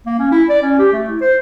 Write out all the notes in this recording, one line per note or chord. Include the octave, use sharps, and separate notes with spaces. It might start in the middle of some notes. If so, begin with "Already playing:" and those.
A#3
C#4
E4
D5
C#4
G4
A3
E4
C5